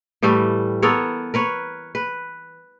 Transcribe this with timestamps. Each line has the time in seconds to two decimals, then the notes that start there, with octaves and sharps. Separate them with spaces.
0.23 A2 E3 G3 A3
0.82 B3 A4 A#4 C#5
1.34 A#4 B4 C#5
1.95 B4